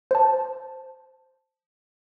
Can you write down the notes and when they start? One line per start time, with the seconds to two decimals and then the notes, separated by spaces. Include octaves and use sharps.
0.11 C5 A5